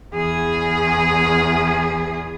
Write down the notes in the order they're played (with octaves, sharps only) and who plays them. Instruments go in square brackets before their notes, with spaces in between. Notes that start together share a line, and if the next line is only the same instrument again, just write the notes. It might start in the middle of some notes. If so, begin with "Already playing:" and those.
[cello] E2 G#4